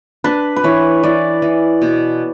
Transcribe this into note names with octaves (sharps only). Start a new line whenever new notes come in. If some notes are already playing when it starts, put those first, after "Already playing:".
D4 B4
B4
E3 C#5
E3 D5
E3
B2